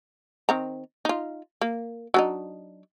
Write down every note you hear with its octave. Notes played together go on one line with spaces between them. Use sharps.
D#3 C4 A#5
D#4 F4
A#3
F#3 D4 D#4